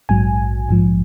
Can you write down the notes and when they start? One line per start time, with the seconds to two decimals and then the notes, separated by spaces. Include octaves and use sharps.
0.09 A#1 G#2 F#3 G#5
0.69 A#1 G#2 F3